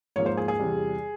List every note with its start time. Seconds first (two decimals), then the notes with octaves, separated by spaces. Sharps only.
0.16 G#2 F3 A#3 C#5
0.26 C5
0.37 G#4
0.48 G#4
0.59 E2 C3 G3